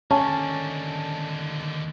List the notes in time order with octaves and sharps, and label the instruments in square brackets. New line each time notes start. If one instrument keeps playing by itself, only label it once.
[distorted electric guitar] D#2 D3 [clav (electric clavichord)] C#4 [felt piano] A5